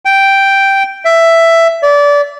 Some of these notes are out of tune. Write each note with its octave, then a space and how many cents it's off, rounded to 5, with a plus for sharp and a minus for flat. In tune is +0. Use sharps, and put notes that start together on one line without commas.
G5 -5
E5 +10
D5 -25